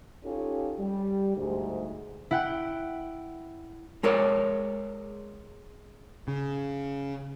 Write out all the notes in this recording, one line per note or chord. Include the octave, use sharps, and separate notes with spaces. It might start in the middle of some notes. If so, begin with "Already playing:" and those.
C#4 D#4 F4 G4 A4
G3
D2 G#2
E4 F#5 G5
G#3 A#4 C#5 D5
C#3